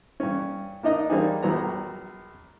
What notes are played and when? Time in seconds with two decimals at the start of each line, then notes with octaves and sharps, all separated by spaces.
0.20 G2 C#4
0.83 A#3 D4 D#4 D#5 D#6
1.10 G3 A#3 C4 D4 D#4 G#4
1.42 A#1 F#2 F#3 G3 B3 A#5